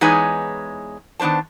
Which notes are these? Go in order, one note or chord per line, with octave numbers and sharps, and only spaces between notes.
E2 G#3 D#4 B4 C#5 G#5
D#3 B3 D4 C5 A5